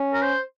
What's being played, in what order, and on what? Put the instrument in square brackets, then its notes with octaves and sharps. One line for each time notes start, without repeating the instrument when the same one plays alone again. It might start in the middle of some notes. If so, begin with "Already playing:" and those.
Already playing: [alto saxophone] C#4
[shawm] A#4
C5